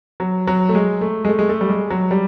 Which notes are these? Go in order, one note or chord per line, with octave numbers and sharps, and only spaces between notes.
F#3
F#3
A3
G#3
A3
G#3
A3
G#3
A3
G3
G#3
F#3
G3